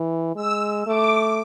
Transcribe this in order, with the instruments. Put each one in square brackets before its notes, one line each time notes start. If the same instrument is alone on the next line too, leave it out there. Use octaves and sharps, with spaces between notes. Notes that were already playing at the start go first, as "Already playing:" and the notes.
Already playing: [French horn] E3
[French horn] G#3 [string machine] E6
[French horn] A3 [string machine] D6